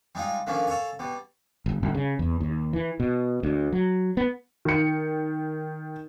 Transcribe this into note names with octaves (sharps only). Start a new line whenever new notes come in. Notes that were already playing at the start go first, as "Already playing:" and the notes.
G3 G#3 D#4 F4
D3 D#3 F3 A#3 C#4
A4 C#5 F5 G#5
B2 G3
G1
G1
C#3
E2
D#2
E3
B2
D2
F#3
B3
D#3 C#7